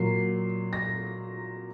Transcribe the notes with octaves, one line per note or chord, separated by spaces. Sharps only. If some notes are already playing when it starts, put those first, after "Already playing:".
Already playing: A#2 F#3 A#3 C7
A#6